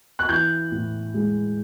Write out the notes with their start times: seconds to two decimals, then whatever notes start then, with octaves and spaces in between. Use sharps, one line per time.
0.19 F#6
0.29 E3 G6
0.72 A2
1.14 G#3